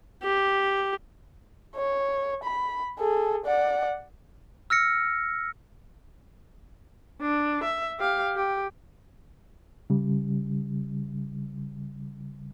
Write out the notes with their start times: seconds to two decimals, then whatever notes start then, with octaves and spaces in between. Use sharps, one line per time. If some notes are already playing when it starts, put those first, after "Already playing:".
0.23 G4
1.75 C#5
2.44 B5
2.99 G#4 A4
3.45 D5 F#5
4.70 E6 F6 A#6 C#7
7.21 D4
7.64 E5
7.99 G4 F5
8.36 G4
9.90 C#3 G3